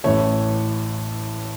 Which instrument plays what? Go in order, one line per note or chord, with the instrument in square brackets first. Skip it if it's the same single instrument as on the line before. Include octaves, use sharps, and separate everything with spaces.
[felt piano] A1 A2 E3 A3 C#5